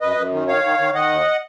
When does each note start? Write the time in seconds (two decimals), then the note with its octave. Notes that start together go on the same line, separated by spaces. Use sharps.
0.01 F#2 B4 D#5
0.17 F#2
0.32 D#3
0.48 D#3 C#5 F5
0.64 D#3
0.79 D#3
0.94 D#3 D#5 F#5
1.10 D#2